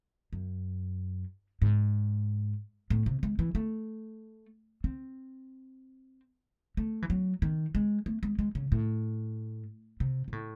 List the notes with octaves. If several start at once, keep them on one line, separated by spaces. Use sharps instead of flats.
F#2
G#2
A2
C3
G#3
E3
A3
C4
A3
E3
F#3
D#3
G#3
A3
G#3
G#3
C#3
A2
C3
C3
A2